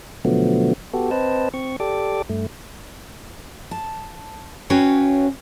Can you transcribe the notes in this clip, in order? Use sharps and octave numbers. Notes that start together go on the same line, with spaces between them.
B2 D3 F3 F#3 A3 B3
B3 F#4 G4 A4
C4 B4 C5 D#5 A5
C4 C#6
G4 A4 D5 D6
G2 A3
A5
C#4 F#4 B4 C#5 F5 G5